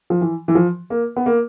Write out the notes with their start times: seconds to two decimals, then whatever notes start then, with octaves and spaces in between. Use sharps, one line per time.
0.10 F3
0.21 E3
0.48 E3
0.55 F3
0.90 A#3
1.16 B3
1.26 A#3